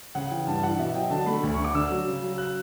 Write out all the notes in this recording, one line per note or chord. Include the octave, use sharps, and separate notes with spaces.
C#3 F#5
E3 G5
G2 A5
E3 F#5
B2 E5
F#3 G5
D3 A5
A3 B5
D2
D3 C#6
D6
D3 E6
F#3
C#3
F#3
F#6